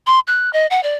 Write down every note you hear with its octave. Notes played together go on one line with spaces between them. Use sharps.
C6
F#6
D#5
F#5
D5